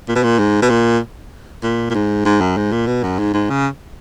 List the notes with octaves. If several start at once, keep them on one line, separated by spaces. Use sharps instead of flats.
A#2
B2
A#2
G#2
B2
A#2
A#2
A#2
G#2
G#2
F#2
G#2
A#2
B2
F#2
G#2
G#2
C#3